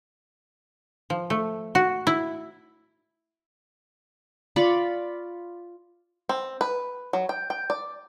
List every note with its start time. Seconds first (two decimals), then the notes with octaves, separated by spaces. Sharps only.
1.10 F3
1.30 A3
1.75 F#4
2.07 E4
4.56 F4 D5 B5 C#6
6.29 C4
6.61 B4
7.13 F#3
7.29 G5
7.50 G5
7.70 D5